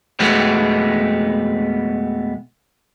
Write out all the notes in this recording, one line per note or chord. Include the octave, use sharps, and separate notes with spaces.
F2 B2 G#3 A3 B3